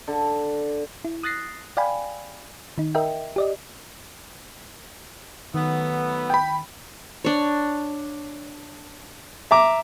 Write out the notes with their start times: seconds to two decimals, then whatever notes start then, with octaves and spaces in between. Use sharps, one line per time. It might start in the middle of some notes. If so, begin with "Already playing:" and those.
0.07 D3
1.05 E4
1.23 D#6 F#6 A6 A#6 C7
1.77 D5 F5 G5 G#5 B5
2.78 D#3 D#4
2.95 A#4 D#5 E5 G5
3.36 G4 D5 D#5
5.54 D#3 F#3 A3 B3
6.30 G5 B5
7.24 D4 C#5
9.51 E5 A#5 D6